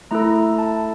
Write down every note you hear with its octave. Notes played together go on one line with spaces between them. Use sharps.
A3 E4 A4 A#5
A5